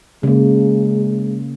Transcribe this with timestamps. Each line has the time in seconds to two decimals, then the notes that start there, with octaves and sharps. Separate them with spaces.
0.23 C#3 G#3 A#3